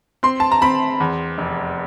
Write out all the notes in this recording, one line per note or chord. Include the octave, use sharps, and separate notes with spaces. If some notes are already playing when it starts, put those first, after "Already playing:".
C4 C6
A5
A#5
C4 B5
E2
F1